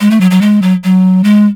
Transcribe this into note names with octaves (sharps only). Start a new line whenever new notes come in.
G#3
A3
F#3
F#3
G#3
F#3
F#3
G#3